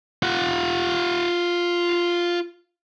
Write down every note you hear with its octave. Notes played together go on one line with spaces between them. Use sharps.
F4 F#5